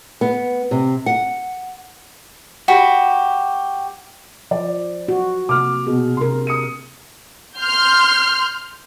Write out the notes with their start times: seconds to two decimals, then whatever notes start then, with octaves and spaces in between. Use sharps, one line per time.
0.21 B3
0.71 C3
1.06 F#5
2.68 F#4 G4 B5
4.51 F3 D5
5.08 F#4
5.49 C3 A#3 D6 F6
5.87 B2 G#4
6.17 C3 D4 A#4 C6
6.47 D#6 C#7 D#7
7.58 C6 F6 G6